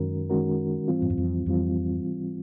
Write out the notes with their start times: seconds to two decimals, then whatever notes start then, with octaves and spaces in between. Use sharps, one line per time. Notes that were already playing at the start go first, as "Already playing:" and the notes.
Already playing: F#2 D#3 G#3 C#4 F#4 A#4
0.30 D#3 G#3 C#4 F#4 A#4
0.88 G#2 E3 G3 C4 F4
1.02 G2
1.10 F#2
1.18 F2
1.46 F2 G#2 E3 G3 C4 F4